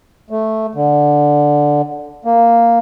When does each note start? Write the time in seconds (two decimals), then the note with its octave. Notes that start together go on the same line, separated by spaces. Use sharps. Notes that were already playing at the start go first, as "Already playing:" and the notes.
0.30 A3
0.75 D3
2.25 A#3